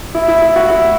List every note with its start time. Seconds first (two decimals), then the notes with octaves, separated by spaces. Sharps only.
0.15 E4
0.28 E4
0.42 E4
0.56 F#4
0.70 E4